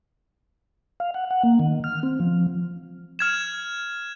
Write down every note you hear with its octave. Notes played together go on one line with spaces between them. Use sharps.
F5
F#5
F#5
A#3
D#3
F6
C4
F3
F6 G#6 E7